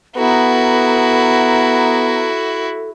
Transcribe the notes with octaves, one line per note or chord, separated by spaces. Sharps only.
B3 E4 F#4 A4 A#5